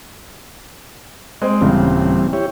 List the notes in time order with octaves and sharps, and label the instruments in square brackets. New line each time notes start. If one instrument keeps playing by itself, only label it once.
[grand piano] G#3 C4
[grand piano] D#1 C#3 [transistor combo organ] E3 G3 C4
[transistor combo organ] E4 G4 C#5